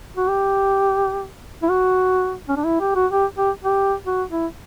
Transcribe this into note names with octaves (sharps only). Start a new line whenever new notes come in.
F#4
G4
E4
F#4
C#4
D4
E4
G4
F#4
G4
G4
G4
F#4
E4